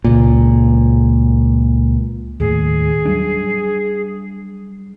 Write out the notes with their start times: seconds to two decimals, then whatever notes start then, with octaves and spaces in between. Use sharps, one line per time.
0.04 C#2 A#2
2.40 D#2 A2 G#4
3.05 F#3 G3 D4